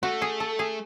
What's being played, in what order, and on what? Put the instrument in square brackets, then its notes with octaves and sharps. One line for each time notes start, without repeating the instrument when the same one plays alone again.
[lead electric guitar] A3 [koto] F#4
[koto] G#4
A4
G#4